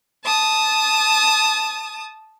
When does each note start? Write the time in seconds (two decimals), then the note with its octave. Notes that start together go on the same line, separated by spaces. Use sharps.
0.24 A5 D#6